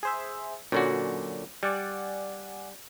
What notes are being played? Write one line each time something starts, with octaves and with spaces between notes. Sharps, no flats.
G#4 C5 E5
A#2 D3 F#3 C#4 F#4
G3 D5 F#5 G#5